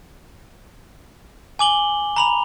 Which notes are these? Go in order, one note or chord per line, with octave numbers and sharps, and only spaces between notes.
G#5 D6 F#7 G7
A#5 B5 F7